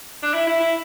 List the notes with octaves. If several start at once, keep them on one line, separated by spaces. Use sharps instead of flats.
D4
E4
E4
E4